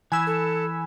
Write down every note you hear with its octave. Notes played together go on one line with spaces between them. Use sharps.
E3 G#5 B5 E6
A4